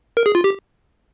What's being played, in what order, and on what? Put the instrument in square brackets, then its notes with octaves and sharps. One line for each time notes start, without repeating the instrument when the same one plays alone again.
[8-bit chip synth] A#4
G#4
F4
G4